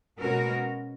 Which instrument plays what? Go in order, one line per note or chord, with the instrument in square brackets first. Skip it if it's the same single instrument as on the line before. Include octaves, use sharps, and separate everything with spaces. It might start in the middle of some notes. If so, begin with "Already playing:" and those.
[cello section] B2 G#3 C#4 F#4 A#4